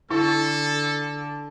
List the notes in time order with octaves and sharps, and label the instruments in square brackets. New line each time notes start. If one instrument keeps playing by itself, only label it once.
[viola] D3 [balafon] E4 [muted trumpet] A4